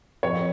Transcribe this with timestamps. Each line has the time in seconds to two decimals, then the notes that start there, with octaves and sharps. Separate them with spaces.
0.23 F2 C#5